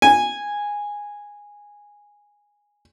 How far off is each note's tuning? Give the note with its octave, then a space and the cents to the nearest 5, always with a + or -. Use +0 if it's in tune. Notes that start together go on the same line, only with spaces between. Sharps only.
G#5 -10